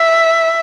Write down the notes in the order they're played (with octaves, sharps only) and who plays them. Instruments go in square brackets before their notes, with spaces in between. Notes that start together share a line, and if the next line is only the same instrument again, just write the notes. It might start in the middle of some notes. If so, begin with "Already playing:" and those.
Already playing: [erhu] E5